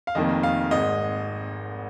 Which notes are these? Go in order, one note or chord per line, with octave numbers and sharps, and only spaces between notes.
F5
F1 F2 D#3 A#3 D#5
F5
G#1 G#2 G#3 D#5